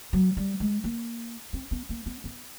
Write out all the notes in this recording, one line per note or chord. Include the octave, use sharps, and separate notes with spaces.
F#3
G3
G#3
A#3
C4
B3
A#3
B3
B3